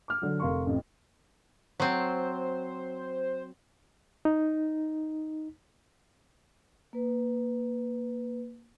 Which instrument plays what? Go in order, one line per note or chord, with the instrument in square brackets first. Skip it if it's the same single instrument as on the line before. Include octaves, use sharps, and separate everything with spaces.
[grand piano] D6 F6
D3 F#3
F1 A#4 F5 C6 C#6
A1 F2
[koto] F#3 C4 [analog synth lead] C5
[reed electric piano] D#4
[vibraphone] A#3 B4